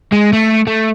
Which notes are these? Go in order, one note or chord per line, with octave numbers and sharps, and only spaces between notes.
G#3
A3
A3